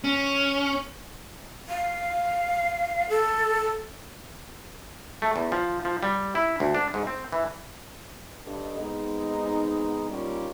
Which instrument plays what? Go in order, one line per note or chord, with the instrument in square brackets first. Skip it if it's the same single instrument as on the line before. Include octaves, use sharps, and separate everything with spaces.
[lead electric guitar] C#4
[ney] F5
A4
[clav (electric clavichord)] A3
E2
F3
F3
G3
E4
D2
D4
G#2
C4
E3
[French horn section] G2 A4 D#5
G#3 B3 C4 D#4
G3 A#3 C#4 D#4 F4 G4